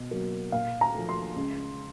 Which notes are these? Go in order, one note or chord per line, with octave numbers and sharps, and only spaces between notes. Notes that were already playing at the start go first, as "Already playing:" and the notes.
Already playing: B2
F#3 A#3
A#2 F5
A#5
F3 A3
C6
C#2